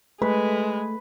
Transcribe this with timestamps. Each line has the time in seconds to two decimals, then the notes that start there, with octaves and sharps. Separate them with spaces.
0.22 G#3 A3 B4